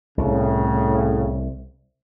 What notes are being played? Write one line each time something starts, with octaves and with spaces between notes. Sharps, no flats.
C2 A2 C#3